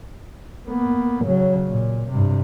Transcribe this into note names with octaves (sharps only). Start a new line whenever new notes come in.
A#3 B3
C#3 F#3
A#2
G2 C3